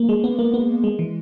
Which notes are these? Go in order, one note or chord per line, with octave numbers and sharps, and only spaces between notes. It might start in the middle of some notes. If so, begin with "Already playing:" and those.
Already playing: A#3
G#3
B3
A#3
B3
G#3
E3